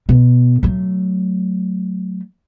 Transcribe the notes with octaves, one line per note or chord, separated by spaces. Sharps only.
B2
F#3 A3